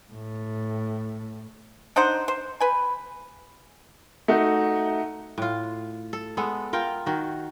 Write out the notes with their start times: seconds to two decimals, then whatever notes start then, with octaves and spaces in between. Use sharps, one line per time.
0.13 A2
1.96 D4 D#4 C5 F#5
2.28 C5
2.60 B4 G#5
4.28 A3 D#4 F#4
5.38 A2 F4
6.13 A4
6.37 G#3 B3 A4
6.73 F4 A#4 G5
7.06 D#3 F#4